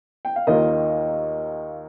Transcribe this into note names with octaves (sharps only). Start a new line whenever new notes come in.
G5
F5
D#2 D#3 A#3 F4 A#4 D#5